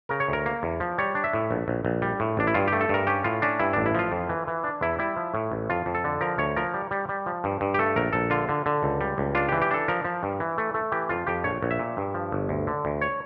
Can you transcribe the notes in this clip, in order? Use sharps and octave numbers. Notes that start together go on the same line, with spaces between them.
C#3 A#4
C#5
D2 A#4
A#3
E2
F3
G3 C#5
D4
E5
A2
A#1
A#1
A#1
G3
A2
A1 D4
E4
G2 F4
A3 G4
A4
G2 A#4
C#4 G4
A2 F4
C#4 D4
G2 E4
A1 D4
E4
F3 F4
F2
E3
E3
D4
E2 E4
G3 E4
F3
A2
A1
F2 F4
F2
A4
D3
F3 A#4
D2 C#5
F3 A#4
G3
G3
G3
F3
G2
G2
G4
A3 A4
A#1 A#4
A#1 A4
D3 F4
D3
D3
C#2
G3
C#2
D4 F4
E3 G4
G4
D4 A4
F3 A#4
F3
G2
E3
A3
A3
E3 G4
F2 F4
F2 G4
A#1 C#5
A#1
E5
A#2
G2
F3
G1
D2
D3
D2
C#5